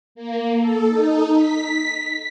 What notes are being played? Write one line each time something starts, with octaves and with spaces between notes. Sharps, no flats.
A#3
A4
D#4
B6